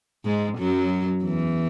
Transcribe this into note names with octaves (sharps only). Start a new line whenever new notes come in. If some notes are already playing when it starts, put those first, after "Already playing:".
G#2 G#3
F#2 F#3
E2 E3